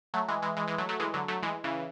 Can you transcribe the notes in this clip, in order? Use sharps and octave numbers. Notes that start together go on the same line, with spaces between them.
F#3 A3
E3 G#3
E3 G#3
E3 G#3
E3 G#3
F#3 A3
F#3 A3
E3 G#3
D3 F#3
F#3 A3
E3 G#3
C#3 E3